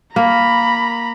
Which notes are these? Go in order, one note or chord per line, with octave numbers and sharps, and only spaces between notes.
A#3 A#5 B5